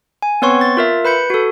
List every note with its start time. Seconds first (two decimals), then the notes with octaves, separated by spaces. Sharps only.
0.22 G#5
0.42 B3 C4 B4 C#5 C6 C#6
0.61 A6
0.77 F4 A#4 E5
1.05 B4 B5 G6 C#7
1.30 F#4 A4